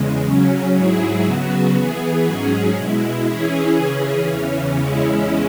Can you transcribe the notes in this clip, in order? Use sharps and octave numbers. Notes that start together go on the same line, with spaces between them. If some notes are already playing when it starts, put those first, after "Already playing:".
Already playing: E2 C#3 G#3
C#3 F#3 C#4
G#2 F#3 E4 G#4
C#3 F#3 B3 F#4
E3 B3 G#4
G#2 F#3 C#4 G#4
B2 G#3 E4
E3 C#4 E4 G#4
C#3 E3 C#4 G#4
E2 C#3 E3 C#4
E2 C#3 G#3 C#4 E4